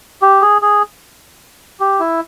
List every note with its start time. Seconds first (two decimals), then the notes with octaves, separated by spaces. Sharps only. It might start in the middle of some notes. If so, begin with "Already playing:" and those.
0.22 G4
0.42 G#4
0.62 G#4
1.80 G4
2.00 E4